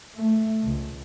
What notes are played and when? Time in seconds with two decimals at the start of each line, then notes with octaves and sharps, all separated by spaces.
0.16 A3
0.64 C#2